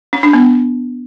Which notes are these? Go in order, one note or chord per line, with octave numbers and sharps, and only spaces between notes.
C#4
D4
B3